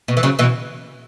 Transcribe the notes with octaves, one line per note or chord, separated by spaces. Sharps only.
B2
E3
C#3 F#3
B2 E3